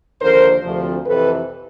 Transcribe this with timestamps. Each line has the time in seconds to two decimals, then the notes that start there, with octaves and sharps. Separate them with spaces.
0.21 D#2 D3 F3 A#4 C5
0.63 D2 C3 F3
1.06 F2 C3 E3 A4 B4